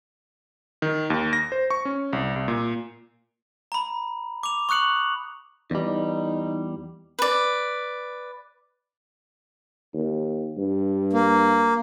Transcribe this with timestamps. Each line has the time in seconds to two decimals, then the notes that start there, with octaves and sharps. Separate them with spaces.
0.82 D#3
1.10 D#2
1.33 A#6
1.52 C5
1.70 C#6
1.85 C#4
2.13 C2
2.36 C2
2.48 A#2
3.72 A#5 B5
4.43 D6 F7
4.69 C#6 D#6 F#6 C#7 F#7
5.71 E2 G3 D#4
7.19 B4 D5
9.93 D#2
10.57 G2
11.13 A#3